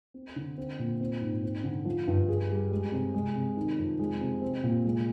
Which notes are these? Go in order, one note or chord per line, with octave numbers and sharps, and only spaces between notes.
C4
D3
C4
A#2
C4
G#2
C4
D3
F3
G2
G#4
G3
G#3
C3
G#3
C3
D#3
F2
G#3
C3
C4
A#2
G#3